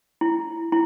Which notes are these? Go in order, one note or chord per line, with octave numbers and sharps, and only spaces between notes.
E4
E4